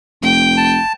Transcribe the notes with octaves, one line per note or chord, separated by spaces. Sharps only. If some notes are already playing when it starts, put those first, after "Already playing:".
F1 G5
A5